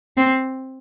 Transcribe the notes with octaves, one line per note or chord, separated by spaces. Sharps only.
C4